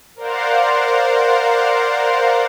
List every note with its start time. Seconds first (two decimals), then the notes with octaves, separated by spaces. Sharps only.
0.16 A#4 C5 D5 F5 F#5